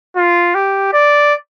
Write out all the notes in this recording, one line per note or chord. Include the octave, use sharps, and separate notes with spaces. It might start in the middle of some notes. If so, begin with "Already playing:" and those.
F4
G4
D5